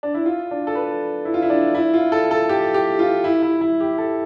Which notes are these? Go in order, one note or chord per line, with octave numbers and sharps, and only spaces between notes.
D4
E4
F4
D4
A4
B4
E4
F4
E4
D4
E4
F4
A4
A4
G4
G4
F4
E4
E4
E4
G4
A4